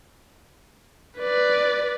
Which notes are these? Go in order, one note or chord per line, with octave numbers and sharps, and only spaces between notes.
B4 D5